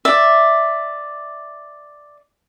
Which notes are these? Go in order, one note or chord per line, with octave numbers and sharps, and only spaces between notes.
D5 E5